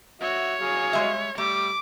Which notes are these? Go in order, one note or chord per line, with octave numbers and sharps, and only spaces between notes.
F#4 C#5 E5
F#3 G#4 F5
G3 G#3 E5
G3 A3 D6